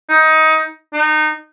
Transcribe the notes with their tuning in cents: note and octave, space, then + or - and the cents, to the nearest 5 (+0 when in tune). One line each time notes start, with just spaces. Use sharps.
D#4 +20
D#4 -25